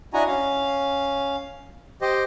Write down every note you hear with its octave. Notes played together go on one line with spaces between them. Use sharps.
D4 E4 F#4 D#5 G#5 A#5
C#4 F5
G4 C5 D#5